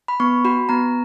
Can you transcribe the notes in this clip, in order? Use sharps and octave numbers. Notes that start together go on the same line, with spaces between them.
B5
B3 C#6
F#4 B5
B3 A#5